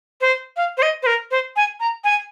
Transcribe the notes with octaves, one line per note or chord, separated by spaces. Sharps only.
C5
F5
C5
D#5
C5
A#4
C5
G#5
A#5
G#5